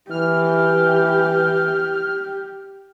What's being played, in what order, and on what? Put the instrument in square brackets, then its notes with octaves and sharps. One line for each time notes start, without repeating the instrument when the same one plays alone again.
[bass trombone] E3 [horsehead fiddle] G4 [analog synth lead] F6